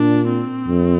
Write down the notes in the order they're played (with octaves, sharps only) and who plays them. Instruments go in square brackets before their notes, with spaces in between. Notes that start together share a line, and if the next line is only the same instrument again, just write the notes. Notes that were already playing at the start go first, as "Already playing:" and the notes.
Already playing: [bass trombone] A#2 [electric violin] D4
[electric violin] C4
[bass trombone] F2